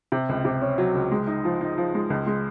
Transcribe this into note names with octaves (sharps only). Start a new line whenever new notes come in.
C3
C#2
C3
C#4
F#3
C#2
G#3
D#4
F3
D#4
F3
G#3
C#2
G#3